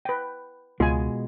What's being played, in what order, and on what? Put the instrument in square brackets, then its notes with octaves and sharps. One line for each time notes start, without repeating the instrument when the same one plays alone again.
[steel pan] B4 G5
[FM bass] C#2 [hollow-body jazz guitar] B2 G#3 [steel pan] F4 G#5